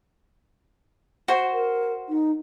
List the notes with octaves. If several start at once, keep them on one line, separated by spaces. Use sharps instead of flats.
F#4 C5
A#4
D#4